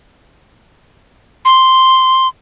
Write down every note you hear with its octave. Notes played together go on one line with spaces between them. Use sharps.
C6